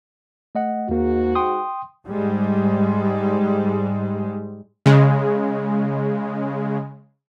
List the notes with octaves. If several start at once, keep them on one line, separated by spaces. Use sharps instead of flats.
A3 D#5 F#5
D#2 G#2 G#3 A#3 F#4
G5 C6 D#6
G#2 G3 G#3
C#3 G#3